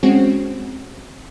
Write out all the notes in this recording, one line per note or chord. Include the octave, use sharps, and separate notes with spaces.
G#3 C4 C#4 F#4